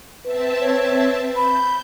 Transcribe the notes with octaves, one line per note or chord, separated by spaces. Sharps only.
C4 B4 E5 A5
C#5
B5 G6